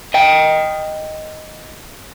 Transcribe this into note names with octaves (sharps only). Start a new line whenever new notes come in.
D#5 G5